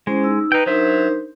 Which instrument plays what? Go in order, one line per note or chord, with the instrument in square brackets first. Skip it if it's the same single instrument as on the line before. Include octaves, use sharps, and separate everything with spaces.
[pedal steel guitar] G#3 [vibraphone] C#4 E4 C5
[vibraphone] D#4 E6
[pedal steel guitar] D#4 G5 [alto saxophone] B4
[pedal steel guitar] F#3 E5 [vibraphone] D4 D#4 A#4 [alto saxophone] C5